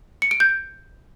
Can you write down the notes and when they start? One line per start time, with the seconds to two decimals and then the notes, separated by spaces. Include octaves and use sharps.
0.22 C#7
0.31 D7
0.40 G6